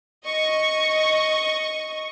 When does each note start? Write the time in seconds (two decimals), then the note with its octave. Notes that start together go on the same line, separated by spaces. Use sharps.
0.24 D#5 C#6